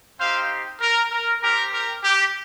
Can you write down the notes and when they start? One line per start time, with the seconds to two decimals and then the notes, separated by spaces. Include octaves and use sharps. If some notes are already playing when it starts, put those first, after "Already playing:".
0.19 C4 D#4 G4 C5 F5
0.81 A#4
1.12 A#4
1.42 C4 G4 A#4
1.73 A#4
2.04 G4